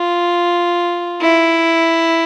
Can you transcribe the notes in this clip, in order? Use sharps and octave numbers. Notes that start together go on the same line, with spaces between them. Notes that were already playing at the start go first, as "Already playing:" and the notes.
Already playing: F4
E4